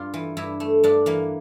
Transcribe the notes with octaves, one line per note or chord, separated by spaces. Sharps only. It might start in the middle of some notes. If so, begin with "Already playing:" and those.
Already playing: G2 F4
E3
G2 E4
A3
G2 D4
E3 A#3